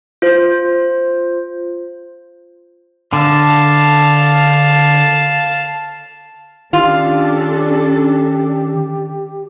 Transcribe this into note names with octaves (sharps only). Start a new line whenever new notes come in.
F4 C5
D3 F5 A5
D#3 C#4 D4 F4 G4 A4